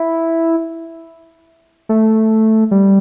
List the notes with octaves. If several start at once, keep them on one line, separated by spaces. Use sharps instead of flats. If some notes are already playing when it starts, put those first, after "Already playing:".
Already playing: E4
A3
G3